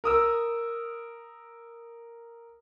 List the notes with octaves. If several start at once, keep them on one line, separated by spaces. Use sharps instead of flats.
A#4 D#6 E6